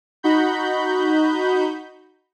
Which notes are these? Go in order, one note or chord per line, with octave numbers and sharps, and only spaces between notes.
D#4 F#4 B5 G6